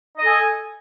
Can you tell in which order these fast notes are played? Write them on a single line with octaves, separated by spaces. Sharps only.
D#5 A4 G#5